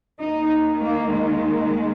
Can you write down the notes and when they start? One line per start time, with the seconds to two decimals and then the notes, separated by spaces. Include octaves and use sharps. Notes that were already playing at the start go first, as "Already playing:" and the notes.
0.20 D#2 D#3 D#4
0.80 A#3
1.10 G#3